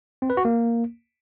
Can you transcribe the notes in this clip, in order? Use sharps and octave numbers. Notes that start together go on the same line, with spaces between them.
C4
B4
F#4
A#3